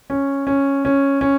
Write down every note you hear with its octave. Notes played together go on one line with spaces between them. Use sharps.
C#4
C#4
C#4
C#4